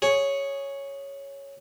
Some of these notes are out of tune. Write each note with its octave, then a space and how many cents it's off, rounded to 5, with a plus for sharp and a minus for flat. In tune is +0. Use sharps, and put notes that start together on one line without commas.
G#4 +0 C#5 +0